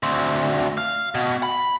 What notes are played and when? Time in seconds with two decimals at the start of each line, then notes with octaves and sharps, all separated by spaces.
0.03 D2 C4
0.78 F5
1.15 B2
1.43 B5